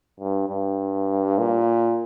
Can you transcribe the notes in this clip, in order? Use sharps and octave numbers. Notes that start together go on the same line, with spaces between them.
G2
G2
A#2